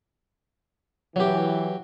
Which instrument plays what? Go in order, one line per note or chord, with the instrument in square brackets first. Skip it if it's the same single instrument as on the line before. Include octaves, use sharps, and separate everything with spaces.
[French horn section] E3 [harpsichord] F#3 G4